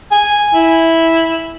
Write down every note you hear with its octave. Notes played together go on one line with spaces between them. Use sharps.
G#5
E4